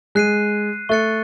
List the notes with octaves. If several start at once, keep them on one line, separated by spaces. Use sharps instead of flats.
G#3 F#6 C7 D#7
A3 C#6 F#6 A6 C#7